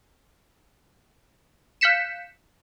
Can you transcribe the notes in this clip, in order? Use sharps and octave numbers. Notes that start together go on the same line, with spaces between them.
F5 F#6 G6 B6 C#7 E7